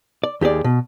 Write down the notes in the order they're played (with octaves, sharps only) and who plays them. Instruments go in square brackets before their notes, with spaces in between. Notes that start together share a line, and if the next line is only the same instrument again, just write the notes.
[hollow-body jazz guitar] D5
D#2 G4 G#4 D5
B2